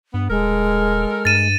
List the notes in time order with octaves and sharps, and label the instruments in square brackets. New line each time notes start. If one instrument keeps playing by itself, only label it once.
[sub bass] G2 [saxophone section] B3
[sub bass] D#1 [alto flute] G#3 [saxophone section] A4 A#4
[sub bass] G2 [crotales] A6 D#7 E7